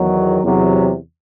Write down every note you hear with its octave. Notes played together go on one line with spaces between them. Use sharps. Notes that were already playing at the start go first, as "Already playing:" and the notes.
Already playing: E2 D#3 F#3
E2 C3 F#3